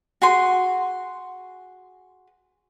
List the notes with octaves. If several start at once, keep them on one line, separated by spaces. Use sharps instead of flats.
F#4 G#4 C6